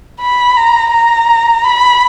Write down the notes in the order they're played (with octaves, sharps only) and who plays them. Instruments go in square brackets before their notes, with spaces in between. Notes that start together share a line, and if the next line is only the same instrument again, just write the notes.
[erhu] B5
A#5
A#5
B5